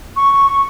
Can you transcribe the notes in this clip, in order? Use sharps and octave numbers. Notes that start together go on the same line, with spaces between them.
C#6